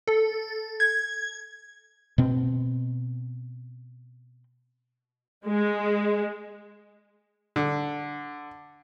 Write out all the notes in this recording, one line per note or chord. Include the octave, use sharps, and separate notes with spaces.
A4
G#6
B2 C4
G#3
D3